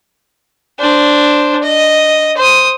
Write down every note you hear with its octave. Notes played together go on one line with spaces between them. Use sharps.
D4 C5
D#5
C5 D#6